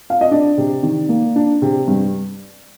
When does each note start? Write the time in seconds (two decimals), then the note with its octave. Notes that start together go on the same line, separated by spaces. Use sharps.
0.10 F5
0.21 D#5
0.31 D4 D5
0.58 C3
0.83 D#3
1.09 A#3
1.36 D4
1.62 C3
1.87 G2